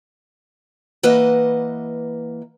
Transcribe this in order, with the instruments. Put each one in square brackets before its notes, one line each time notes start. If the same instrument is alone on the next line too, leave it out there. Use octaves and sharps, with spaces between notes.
[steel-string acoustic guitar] E3 A#3 B4 D#5 F#5